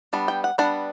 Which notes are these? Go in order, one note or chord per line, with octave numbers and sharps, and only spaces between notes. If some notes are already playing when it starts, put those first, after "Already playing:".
G3 B3 D4
G5
F#5
G3 B3 D4 F#5